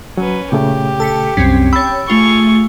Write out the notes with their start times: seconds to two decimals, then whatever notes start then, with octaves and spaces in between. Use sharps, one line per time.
0.17 F#3 C#4 B4
0.52 A#2 C#3 A3 G4
1.00 A4 A5 B6 C#7
1.37 C2 F#2 C4 C#4 B6
1.73 C#5 G5 B5 E6 A6
2.09 A3 F4 G#4 C#6 G7